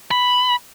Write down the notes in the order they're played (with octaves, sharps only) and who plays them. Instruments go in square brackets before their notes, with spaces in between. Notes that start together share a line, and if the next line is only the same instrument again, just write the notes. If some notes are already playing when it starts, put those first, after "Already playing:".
[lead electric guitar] B5